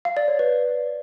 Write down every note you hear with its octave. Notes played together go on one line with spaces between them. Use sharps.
F5
D5
C#5
B4